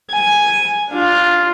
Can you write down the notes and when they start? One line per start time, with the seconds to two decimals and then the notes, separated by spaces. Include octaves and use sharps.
0.11 G#5
0.90 D4 F4